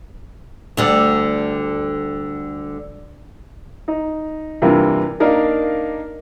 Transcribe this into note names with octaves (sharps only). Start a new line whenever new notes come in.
D2 D3 G3
D#4
G2 C3 E3 A#3 F4
A#3 D4 D#4 A#4 F5